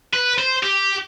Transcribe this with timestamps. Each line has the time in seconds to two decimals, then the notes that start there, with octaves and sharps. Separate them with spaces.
0.13 B4
0.38 C5
0.63 G4